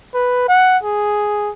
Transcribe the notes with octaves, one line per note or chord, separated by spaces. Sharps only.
B4
F#5
G#4